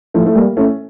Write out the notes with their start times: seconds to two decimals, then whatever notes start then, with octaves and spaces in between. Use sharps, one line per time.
0.14 F3 A3
0.26 A3
0.35 G3 A#3
0.57 A3 C#4